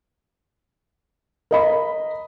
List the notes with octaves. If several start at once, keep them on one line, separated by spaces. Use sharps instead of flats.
A#4 D#5 B5